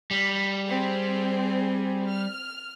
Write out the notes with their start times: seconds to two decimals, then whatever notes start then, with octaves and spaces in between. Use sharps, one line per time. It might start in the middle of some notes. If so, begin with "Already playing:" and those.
0.11 G3
0.67 C4 G#4
2.11 F6